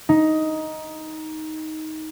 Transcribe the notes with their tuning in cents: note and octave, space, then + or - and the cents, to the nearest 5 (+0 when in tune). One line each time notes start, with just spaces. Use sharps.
D#4 +10